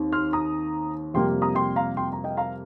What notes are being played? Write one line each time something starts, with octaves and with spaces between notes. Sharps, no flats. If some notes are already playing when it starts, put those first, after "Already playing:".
Already playing: D#2 D#3 C4
C6 F6
A#5 D#6
F2 C3 G3 A#3 G5 C6
A#5 D#6
G5 C6
F5 A#5
G5 C6
A#5
D#5 G5
F5 A#5